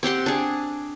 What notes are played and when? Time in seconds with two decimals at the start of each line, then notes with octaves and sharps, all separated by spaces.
0.03 C4 G4 F#5 C6
0.26 D4 G#4